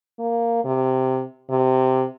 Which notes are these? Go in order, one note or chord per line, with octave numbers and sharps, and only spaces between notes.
A#3
C3
C3